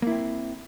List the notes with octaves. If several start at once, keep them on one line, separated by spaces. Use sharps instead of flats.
A#3 C4 E4